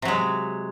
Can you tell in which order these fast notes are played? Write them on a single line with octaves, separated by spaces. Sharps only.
C3 F#3 G#3